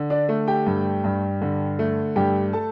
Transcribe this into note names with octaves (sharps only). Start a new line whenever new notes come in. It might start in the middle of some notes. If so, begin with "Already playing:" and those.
Already playing: D3
D4 D5
A3
G4 G5
G2
G2
D3
A3
G2 G4 G5
A4 A5